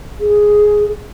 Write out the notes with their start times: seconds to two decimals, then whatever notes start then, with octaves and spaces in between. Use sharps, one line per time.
0.20 G#4